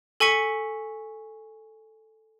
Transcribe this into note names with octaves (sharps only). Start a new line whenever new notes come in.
A4 G#5 C#6 B6 C#7